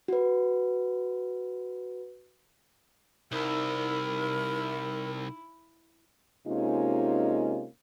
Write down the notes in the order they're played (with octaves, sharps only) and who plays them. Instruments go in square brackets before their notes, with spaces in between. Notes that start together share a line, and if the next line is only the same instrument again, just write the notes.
[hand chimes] F#4 B4
[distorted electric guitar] C2 [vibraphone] D#4 E6 [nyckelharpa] E4 [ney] A#4
[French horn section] C3 G#3 A#3 C#4 D#4 F4